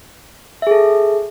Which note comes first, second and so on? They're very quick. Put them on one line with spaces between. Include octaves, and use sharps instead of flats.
E5 G#4 A4